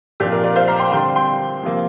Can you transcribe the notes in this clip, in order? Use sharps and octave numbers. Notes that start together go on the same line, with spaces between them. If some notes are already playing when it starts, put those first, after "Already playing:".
A#2 F3 C4 D4 G4
F4 A#4
A#4 D5
C5 F5
F5 A#5
G5 C6
D3 G3 C4 G5 C6
G5 C6
C3 F3 A#3